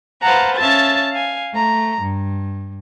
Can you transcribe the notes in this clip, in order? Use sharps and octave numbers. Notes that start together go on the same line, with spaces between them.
B4 C5 F5 F#5 A5 A#5
C#4 E5 F5 A5 A6
F5 G#5
A3 A#5
G2